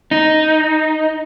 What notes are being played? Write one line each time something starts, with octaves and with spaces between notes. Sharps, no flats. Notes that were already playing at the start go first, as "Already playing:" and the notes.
D#4